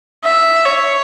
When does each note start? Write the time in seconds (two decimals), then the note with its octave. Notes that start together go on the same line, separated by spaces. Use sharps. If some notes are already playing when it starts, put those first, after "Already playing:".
0.24 E5
0.65 C#5